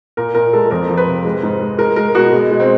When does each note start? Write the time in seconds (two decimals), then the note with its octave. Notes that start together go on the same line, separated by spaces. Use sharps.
0.17 A#2 A#4
0.34 A#2 A#4
0.53 G#3 A4
0.71 F2 A#4
0.89 F3
0.97 B4
1.07 C3
1.25 G#3
1.43 G#2
1.61 G#3
1.78 G#3 A#4
1.96 G#3 A#4
2.15 B2 F#4
2.33 G#3
2.51 G#3
2.60 C4